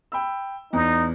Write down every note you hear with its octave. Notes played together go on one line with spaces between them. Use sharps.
G5 B5 E6
E2 D#4